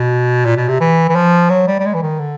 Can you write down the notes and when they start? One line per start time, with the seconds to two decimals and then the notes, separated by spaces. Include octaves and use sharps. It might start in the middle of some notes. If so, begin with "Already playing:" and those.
Already playing: B2
0.45 A#2
0.57 B2
0.68 C3
0.81 E3
1.09 E3
1.15 F3
1.50 F#3
1.67 G3
1.80 G3
1.85 G#3
1.94 E3
2.02 D#3
2.19 D3